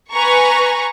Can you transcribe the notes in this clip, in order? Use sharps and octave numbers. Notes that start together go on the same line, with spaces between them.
B4 G#5 A#5 C#6